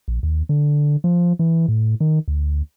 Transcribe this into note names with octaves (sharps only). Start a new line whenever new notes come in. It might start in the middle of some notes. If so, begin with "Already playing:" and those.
A#1
D#2
D3
F3
E3
A2
D#3
D2